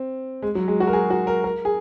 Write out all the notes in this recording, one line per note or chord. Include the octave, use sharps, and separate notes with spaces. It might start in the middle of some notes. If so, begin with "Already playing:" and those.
Already playing: C4
G#3
F#3
G#3
F#4
A#4
G#4
F#4
A#4
A#4
G#4